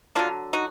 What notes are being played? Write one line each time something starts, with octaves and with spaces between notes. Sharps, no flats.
D3 F#3 A#3 D4 F4
D#4 F#4